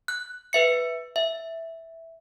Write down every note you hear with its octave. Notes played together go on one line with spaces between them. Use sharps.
F#6
B4 E5 C#7
E5